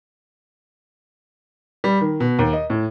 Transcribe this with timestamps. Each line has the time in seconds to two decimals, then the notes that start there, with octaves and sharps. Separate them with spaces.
1.84 G3
2.01 D#3
2.20 B2
2.39 D#2
2.53 D#5
2.70 A2